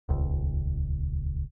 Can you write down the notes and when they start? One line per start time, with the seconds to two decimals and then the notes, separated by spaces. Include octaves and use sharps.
0.09 D#1 C#2